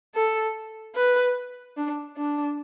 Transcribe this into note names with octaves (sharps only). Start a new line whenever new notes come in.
A4
B4
D4
D4